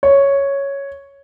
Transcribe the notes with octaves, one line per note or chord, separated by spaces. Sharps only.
C#5